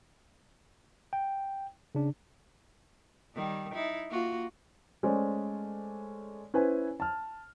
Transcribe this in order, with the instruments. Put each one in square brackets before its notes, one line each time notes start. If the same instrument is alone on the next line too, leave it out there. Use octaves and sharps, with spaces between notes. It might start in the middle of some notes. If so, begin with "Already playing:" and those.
[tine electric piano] G5
C#3 D4
[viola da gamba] D#3 G3
D#4 E4
A#3 F4 F#4
[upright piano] G#3 A3 C#4 A4 C5 D5
C#4 E4 B4 C5 G#5
A5 F6